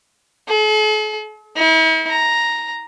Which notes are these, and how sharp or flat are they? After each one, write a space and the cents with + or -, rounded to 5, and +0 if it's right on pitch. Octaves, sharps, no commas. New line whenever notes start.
A4 -45
E4 -45
A#5 +0